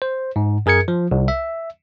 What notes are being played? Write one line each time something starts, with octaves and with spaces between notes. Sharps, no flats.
C5
G#2
F#2 G#4 A#4 G#6 C#7
F3
C2
E5